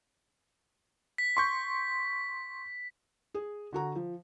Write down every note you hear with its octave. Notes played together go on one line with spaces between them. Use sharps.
B6
C6 C#6 G6
G#4
D3 F#4 A#5
F3